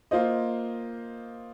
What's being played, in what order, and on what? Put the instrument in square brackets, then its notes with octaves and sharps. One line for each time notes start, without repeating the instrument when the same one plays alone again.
[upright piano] A#3 F4 C5 D#5